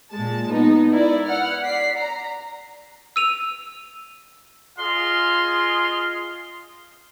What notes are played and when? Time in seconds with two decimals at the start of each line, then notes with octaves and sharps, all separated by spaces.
0.13 A#2 G#3 A5
0.52 G#3 B3 D#4
0.92 E4 A#4 B4 D5
1.24 F#5 F6
1.63 D5 B6 C7
1.95 A#5
3.16 E6 D#7 F7
4.77 F4 G#4 D#5 F5 C6